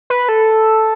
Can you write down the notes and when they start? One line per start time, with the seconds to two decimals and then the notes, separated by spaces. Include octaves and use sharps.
0.10 B4
0.29 A4